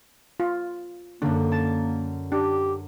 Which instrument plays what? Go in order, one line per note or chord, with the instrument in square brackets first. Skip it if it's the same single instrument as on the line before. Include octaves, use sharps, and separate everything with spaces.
[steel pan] F4
[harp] F#2 D3 [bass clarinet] A#3 [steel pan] D4
[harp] A5 A6
[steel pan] D4 [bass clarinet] G4